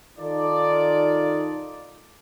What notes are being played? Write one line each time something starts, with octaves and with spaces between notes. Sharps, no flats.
D#3 D#4 F4 A4 D5